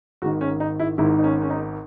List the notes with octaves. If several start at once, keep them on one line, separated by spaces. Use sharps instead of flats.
G#1 G#2 D#3 F#4
C#4
D#4
E4
G#1 G#2 D#3 E4
D#4
C#4
C#4
D#4